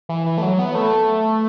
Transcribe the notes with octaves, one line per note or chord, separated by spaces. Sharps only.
E3
E3
A3
F#3
B3
A3